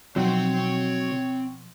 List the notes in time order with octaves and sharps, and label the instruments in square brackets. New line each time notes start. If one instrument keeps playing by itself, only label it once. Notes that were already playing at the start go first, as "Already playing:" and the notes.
[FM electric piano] B2 F3 [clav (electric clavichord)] F#3 D#4 F#4 [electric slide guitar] C4 G5 [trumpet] C#5